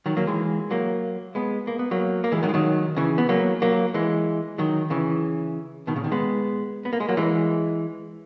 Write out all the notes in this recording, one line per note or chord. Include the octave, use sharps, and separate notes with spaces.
D#3 F#3
F#3 A#3
E3 G#3
F#3 A#3
G#3 B3
A#3
B3
F#3 A#3
A#3
E3 G#3
D#3 F#3
G#3
D#3 F#3
C#3 E3
B3
F#3 A#3
F#3 A#3
E3 G#3
D#3 F#3
C#3 E3
B2 D#3
A#2 C#3
B2 D#3
G#3 B3
B3
A#3
G#3
F#3 A#3
E3 G#3